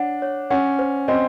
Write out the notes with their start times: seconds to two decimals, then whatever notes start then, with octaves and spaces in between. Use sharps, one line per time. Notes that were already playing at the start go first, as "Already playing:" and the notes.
Already playing: D4 C#5 F#5
0.22 C#5
0.50 C#4 F#5
0.79 C5
1.08 C4 D#5